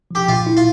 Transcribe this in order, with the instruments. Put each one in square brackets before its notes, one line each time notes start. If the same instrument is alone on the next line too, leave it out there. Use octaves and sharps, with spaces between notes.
[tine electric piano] F3 [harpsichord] G4
[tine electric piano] A#2 [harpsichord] F4
[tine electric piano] E4
[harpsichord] F4